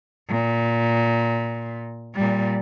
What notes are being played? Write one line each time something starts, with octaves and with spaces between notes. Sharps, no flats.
A#2
A#2 G3